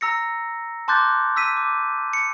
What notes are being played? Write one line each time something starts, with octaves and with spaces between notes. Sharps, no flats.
A#5 E6 A#6 C#7
A5 C6 D6 F#6 G6 A6
E6 B6 D#7
D6
C#7